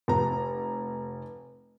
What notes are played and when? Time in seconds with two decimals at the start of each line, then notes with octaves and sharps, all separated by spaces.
0.08 F1 A#5